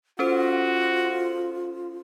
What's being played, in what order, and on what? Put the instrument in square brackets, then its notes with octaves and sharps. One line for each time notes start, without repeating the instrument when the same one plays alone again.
[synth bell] C#4 A4 C5 [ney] F4 [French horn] F#4